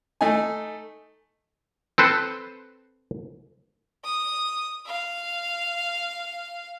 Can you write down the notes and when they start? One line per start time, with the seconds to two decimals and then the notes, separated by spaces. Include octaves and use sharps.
0.21 A3 D#4 G#5
1.98 C4 A4 B4 C5
4.05 D#6
4.87 F5